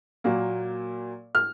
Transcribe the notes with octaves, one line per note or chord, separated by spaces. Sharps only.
A#2 F#3 A#3
F6